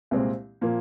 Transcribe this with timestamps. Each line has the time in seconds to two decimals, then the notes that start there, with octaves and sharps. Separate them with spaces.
0.11 C2 A#2 G#3 C4
0.61 A#2 F3 A#3